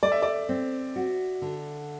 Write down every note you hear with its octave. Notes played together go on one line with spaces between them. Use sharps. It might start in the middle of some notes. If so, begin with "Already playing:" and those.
A3 D5
E5
D5
C4
F#4
D3